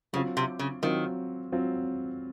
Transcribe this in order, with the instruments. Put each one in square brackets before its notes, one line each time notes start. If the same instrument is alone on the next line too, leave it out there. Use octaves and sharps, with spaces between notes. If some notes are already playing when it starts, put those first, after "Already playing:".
[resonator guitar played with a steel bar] C#3 [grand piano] F#3 C4 F4
[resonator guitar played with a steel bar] C3
C#3
[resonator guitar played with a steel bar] D#3 [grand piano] F#3 C4 F4
[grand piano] F#3 C4 F4